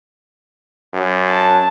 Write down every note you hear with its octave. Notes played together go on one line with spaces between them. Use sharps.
F#2
A5